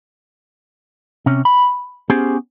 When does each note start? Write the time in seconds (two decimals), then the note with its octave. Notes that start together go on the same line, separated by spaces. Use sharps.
1.26 C3 C#4
1.45 B5
2.10 B3 C#4 G4 G#4 C5